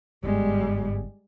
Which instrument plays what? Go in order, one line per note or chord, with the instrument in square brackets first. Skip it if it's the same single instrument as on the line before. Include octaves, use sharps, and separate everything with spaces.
[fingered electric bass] G1 G#2 B3 [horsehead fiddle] G3 G#3